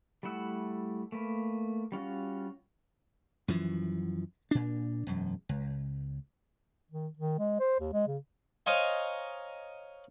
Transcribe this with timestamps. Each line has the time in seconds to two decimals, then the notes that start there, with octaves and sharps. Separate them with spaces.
0.23 G3 A3 E4 F#5 E6
1.12 A3 A#3 B4
1.92 G3 C#4 F4 F#4
3.48 F#2 E3 F3
4.51 A#2 D4
5.07 E1 F#2
5.49 C#2
6.91 D#3
7.17 D#3
7.39 G#3
7.60 C5
7.80 D#2
7.94 G#3
8.07 C#3
8.66 C5 C#5 D#5 F5 G#5 A#5